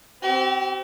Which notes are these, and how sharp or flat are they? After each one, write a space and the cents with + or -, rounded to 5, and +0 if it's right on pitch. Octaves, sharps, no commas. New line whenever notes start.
C4 +0 G4 -45